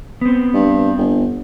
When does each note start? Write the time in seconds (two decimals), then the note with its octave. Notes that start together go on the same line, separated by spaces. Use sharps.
0.21 B3 C4
0.54 G2
0.98 G1